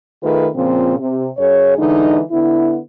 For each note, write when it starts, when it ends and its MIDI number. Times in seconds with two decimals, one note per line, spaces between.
0.22 0.48 51
0.22 0.48 57
0.22 0.48 65
0.22 0.48 68
0.22 0.48 71
0.54 0.96 46
0.54 0.96 49
0.54 0.96 53
0.54 0.96 60
0.97 1.27 48
1.38 1.78 42
1.38 1.78 68
1.38 1.78 73
1.78 2.20 50
1.78 2.20 52
1.78 2.20 56
1.78 2.20 63
2.31 2.78 50
2.31 2.78 59
2.31 2.78 64